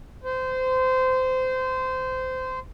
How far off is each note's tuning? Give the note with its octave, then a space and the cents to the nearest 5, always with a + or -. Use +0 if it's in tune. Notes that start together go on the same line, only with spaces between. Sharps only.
C5 -20